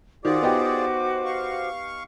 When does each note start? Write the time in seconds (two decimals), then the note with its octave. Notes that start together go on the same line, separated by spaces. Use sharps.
0.25 D#3 F4 F#4 G#4 C5 D5 D6
0.42 B3 D#4 G4
1.25 F5 C#6